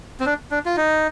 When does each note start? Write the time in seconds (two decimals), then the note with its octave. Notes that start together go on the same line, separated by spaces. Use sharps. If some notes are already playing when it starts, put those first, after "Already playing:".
0.20 C4
0.26 D4
0.51 D4
0.66 F4
0.77 D#4